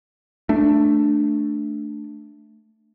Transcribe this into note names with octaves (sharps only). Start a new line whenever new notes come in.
A3 D4